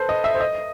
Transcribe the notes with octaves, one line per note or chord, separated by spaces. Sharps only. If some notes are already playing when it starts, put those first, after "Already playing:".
Already playing: A4 B4 C5
D#5
E5
C5
D#5